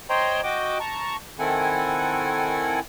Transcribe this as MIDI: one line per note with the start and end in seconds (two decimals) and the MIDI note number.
0.10 0.41 72
0.10 0.41 73
0.10 0.41 75
0.10 0.41 79
0.10 0.41 82
0.10 0.41 84
0.43 0.78 66
0.43 0.78 75
0.43 0.78 79
0.43 0.78 86
0.80 1.16 81
0.80 1.16 82
0.80 1.16 85
1.39 2.80 51
1.39 2.80 60
1.39 2.80 64
1.39 2.80 69
1.39 2.80 78
1.39 2.80 80